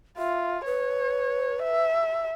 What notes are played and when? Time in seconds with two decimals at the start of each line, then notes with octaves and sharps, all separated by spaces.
0.18 F4 E5
0.66 B4 C#5
1.63 E5